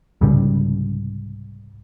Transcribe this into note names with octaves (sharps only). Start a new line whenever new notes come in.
C2 G#2 C#3 G3